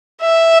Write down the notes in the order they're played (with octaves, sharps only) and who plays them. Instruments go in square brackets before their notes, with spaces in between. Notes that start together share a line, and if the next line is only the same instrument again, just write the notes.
[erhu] E5